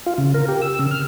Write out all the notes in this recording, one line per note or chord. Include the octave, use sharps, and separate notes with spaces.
F4
C#3
A#4
G4
E6
C#3
F6